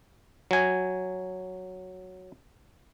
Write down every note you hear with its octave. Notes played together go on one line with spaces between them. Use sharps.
F#3 G#5